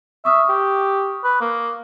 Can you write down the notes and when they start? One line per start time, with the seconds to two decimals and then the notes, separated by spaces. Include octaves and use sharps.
0.25 E5 C#6 D#6 F6
0.49 G4
1.24 B4
1.41 A#3